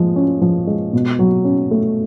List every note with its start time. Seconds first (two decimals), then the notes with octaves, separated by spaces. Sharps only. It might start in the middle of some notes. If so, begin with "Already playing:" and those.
Already playing: F3 G#3
0.16 C#4
0.41 F3
0.67 G#3
0.93 B2
1.19 F#3
1.44 C#4
1.71 A3